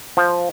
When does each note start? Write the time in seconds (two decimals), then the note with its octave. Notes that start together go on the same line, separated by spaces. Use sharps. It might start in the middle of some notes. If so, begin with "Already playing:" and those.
0.17 F3